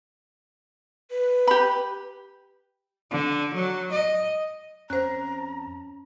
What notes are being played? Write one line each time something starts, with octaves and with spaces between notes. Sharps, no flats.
B4
G4 B5
D3
F#3
D#5
F2 C#4 C5 A#5 F#6